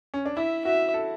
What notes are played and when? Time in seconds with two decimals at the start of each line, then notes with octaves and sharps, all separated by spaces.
0.14 C#4
0.26 D4
0.36 E4 E5
0.65 F#4 E5
0.94 A4